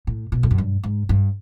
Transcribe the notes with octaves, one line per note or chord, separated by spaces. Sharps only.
A2
B2
F2
F#2
G2
G#2
G2